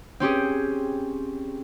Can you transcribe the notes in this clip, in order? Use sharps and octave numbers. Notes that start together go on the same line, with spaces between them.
C4 C#4 G4 G#4